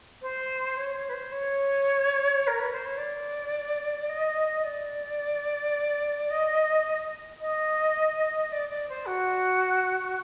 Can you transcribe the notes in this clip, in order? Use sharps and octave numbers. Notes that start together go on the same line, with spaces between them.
C5
C#5
C#5
B4
C5
C#5
A#4
B4
C5
C#5
D5
D#5
D5
D#5
D#5
D5
D5
C5
F#4